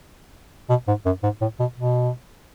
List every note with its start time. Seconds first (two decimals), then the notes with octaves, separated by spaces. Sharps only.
0.70 B2
0.88 G#2
1.06 F#2
1.23 G#2
1.41 A2
1.60 B2
1.78 B2